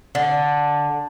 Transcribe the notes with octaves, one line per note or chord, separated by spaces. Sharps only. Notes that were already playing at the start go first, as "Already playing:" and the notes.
D3